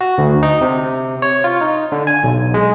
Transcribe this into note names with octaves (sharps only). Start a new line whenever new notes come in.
F#4
D2
D#4
C3
C#5
F4
D#4
D3
G#5
B1
G#3